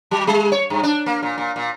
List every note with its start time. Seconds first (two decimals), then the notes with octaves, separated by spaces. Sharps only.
0.11 F#3
0.27 G3
0.52 C#5
0.70 G2
0.83 D4
1.06 A#3
1.23 A#2
1.38 A#2
1.56 A#2